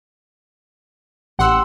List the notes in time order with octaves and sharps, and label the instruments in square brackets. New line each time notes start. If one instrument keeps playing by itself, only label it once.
[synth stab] A1 F#5 [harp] G4 C6 E6